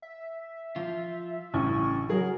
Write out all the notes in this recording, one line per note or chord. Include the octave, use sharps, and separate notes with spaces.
E5
F3 F4
A1 G2 C#3 C#6
F#3 G#4 A#4